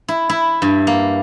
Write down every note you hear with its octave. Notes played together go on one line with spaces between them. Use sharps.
E4
E4
G2
A#3